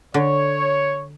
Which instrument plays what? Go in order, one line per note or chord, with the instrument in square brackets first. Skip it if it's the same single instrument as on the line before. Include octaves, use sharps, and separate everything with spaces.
[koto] D3 [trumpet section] C#5